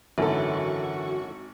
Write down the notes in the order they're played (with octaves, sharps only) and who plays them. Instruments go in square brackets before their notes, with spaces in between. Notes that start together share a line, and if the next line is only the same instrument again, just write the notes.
[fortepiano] G#1 A4 [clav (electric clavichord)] F#2 [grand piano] D3 E3 E4 [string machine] F#4 C#6